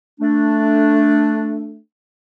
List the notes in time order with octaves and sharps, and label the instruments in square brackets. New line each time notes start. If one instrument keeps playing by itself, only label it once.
[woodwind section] A3 D4